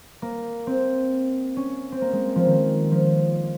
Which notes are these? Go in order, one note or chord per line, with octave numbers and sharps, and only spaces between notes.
A#3
C4
C#4
C4
A#3
G#3
F3
D#3
F3